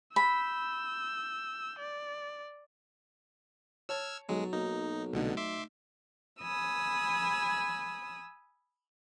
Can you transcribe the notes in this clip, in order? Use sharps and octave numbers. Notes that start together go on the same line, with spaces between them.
B5 E6 G6
D5
C#5 A5 E6 F6 G#6
B1 F#3 G#3
B1 A#3 D#4
C2 B2 D3 A3 D#4
E5 C6 D6
G#5 B5 D#6 E6